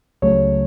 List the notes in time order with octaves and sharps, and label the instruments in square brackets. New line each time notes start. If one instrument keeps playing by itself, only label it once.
[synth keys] C#2 C#3 F#3 A3 C#5